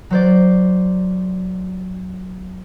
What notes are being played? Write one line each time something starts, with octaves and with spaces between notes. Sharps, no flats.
F#3 C5 D5